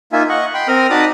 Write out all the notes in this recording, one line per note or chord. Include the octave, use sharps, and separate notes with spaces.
A#3 D#4 F4 E5 G#5
D#5 F#5 C#6
G5 B5 C6
C4 A#4 D#6 F6
D#4 F#4 D5 A5 B5 D#6